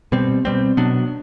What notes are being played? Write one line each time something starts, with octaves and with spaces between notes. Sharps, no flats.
B2 G3 C4
B2 G3 C4
B2 F#3 B3 D4